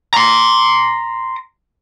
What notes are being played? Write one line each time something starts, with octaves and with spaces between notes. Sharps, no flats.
A#5 C6